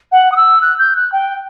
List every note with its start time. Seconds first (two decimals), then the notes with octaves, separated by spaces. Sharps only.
0.12 F#5
0.32 D#6
0.36 E6
0.62 F#6
0.78 G6
0.96 F#6
1.12 G5